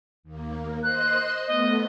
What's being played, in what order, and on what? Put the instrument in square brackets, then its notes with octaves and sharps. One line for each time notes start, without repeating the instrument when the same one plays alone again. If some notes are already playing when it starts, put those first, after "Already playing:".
[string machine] D#2 A#3
[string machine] C5 D#5 C6 [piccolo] F#6
[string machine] A3 B3 [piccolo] D#5